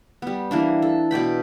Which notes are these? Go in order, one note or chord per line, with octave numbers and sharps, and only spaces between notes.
G3 B3
E3 A#3 D4
A4
B2 D5 G5 B5